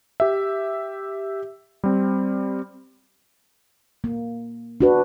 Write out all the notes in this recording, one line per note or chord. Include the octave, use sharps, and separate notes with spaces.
G4 E5
G3 C4
A#3
D4 F#4 B4